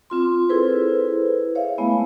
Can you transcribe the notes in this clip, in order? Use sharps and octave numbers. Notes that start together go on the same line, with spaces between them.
C4 F4 C6
E4 G#4 A4 B4 C5
C#5 E5 F5
G#3 A3 B3 E4